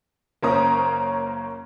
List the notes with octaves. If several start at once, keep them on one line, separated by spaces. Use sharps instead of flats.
F#1 A#3 C#4 C5 A#5 D#6